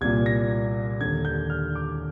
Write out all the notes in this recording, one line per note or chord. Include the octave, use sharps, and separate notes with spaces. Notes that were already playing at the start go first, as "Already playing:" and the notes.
C2 A#2 G#6
A#6
D#2 D3 G#6
G6
F6
D6